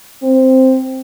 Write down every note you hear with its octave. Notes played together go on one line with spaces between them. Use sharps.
C4